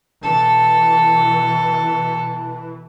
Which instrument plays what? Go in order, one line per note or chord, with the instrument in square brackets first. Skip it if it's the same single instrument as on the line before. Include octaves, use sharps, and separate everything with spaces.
[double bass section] B2 E3 [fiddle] A4